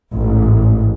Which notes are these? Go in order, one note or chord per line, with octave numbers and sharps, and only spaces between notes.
A1 G#2